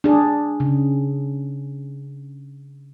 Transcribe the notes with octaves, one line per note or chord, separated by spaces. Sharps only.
D4 G#4
C#3